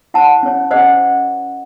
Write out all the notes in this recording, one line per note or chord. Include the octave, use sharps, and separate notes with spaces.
E4 C5 F#5 A5
C#4 G#4 C#5
C#4 G#4 C5 D#5 F#5